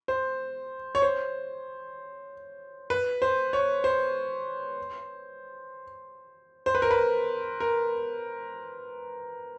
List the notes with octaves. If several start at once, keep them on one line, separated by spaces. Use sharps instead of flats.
C5
C#5
C5
B4
C5
C#5
C5
C5
B4
A#4
B4
A#4